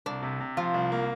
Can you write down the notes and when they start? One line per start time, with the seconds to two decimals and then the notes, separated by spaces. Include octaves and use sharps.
0.06 C2 D4
0.23 C3
0.41 C3
0.57 F3 F4
0.74 C2
0.92 A#3